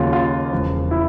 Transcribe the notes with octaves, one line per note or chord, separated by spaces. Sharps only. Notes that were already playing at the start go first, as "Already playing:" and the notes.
Already playing: D#2 C#3 F#3 F4
F4
E1 E2 C#3 F3
E4